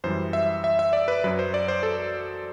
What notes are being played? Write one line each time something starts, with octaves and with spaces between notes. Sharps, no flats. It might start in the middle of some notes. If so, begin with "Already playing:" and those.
F#2 E3 G3 C5
E5
E5
E5
D5
B4
F#2 F#3 B4
C5
D5
C5
A4